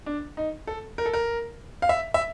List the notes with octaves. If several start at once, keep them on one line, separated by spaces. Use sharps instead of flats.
D4
D#4
A4
A#4
A4
A#4
F5
E5
E5